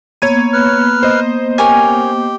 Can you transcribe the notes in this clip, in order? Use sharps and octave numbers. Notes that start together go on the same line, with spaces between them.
A#3 B3 C#5 G#6 D#7
B4 F6
C5 D#5
C#4 G4 A#4 G#5